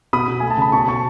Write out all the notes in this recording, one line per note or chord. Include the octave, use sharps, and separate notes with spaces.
B2 B5 D#6
B2
A3 G#5
A5
C#3 B5
B2 A5 C#6
B2 A5 C#6